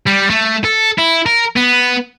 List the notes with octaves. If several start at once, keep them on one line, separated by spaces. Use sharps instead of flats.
G3
A3
A4
E4
A#4
B3